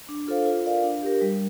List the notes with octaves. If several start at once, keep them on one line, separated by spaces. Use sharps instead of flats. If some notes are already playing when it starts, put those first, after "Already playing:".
D4
F4 A4 C5 F5
F4
A#4 D5 F5
D4
G4 A#4
G3